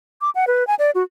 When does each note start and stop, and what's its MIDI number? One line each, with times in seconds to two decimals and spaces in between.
0.21 0.30 86
0.35 0.45 78
0.47 0.66 71
0.67 0.75 80
0.79 0.91 74
0.95 1.03 66